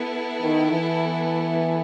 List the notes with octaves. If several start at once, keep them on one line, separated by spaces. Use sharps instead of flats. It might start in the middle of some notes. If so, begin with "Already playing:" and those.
Already playing: B3 E4 A4
D#3
E3